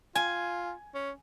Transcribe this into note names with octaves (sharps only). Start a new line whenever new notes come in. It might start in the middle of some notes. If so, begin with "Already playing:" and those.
F4 G#5
C#4